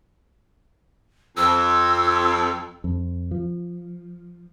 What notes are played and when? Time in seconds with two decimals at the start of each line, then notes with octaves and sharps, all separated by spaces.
1.37 F2 E6
2.84 F2
3.31 F3